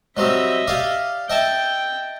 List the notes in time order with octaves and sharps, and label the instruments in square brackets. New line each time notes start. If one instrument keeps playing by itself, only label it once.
[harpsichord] F#3 G3 C4 [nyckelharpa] D#5 E5
[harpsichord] G4 D5 F5
[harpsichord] D#5 E5 A5 [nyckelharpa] G5